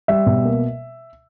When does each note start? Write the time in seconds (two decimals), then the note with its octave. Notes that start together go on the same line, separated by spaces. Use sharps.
0.08 G3 E5
0.26 B2
0.45 A#3